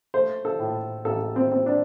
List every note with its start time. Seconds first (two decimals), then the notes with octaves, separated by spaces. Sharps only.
0.14 A3 C5
0.45 A4
0.59 A2
1.05 A1 A4
1.36 C4
1.52 C4
1.66 D4